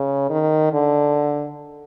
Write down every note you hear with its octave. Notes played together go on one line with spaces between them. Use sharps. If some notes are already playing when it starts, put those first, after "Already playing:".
Already playing: C#3
D#3
D3